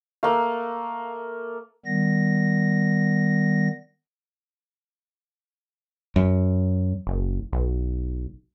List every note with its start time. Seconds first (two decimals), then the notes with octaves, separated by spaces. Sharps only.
0.23 A3 A#3 F5
1.86 D#3 G3 B3 A#6
6.16 F#2
7.07 F#1
7.53 B1